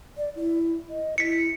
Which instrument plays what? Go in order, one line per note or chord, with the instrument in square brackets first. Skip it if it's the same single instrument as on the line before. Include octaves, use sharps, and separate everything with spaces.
[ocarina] D5
E4
D#5
[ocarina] E4 [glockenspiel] B6 C#7